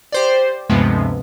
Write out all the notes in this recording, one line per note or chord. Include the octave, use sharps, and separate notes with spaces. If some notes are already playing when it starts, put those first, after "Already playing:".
G4 C5 D5
D2 G2 C3 F3 G#3 B3